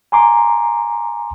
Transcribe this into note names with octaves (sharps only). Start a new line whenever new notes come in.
G#5 A#5 C6 D6